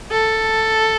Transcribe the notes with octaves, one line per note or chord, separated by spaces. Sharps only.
A4